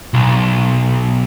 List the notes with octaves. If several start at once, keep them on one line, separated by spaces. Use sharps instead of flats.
B1